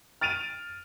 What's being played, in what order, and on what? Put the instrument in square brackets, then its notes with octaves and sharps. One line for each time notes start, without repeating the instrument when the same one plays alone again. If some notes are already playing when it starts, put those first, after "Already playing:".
[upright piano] F6 A6 D7 D#7 F7